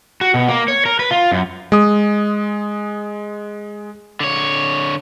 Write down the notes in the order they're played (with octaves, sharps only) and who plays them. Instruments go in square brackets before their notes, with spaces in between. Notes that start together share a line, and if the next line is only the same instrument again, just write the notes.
[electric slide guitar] F#4
B2
A#3
C#5
A#4
B4
F4
F#2
[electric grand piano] G#3 D#6
[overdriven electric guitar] D3 C#5